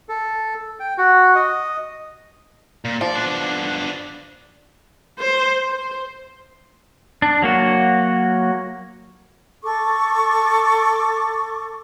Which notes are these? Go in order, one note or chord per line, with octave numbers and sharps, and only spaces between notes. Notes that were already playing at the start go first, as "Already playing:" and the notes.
A4
G5
F#4
D#5
A#2
F3 D5
B3 D4
C5
C5
D4
F#3 A#3 F#4
A4 C#6 D6